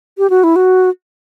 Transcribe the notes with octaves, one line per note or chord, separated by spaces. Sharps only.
G4
F#4
E4
F#4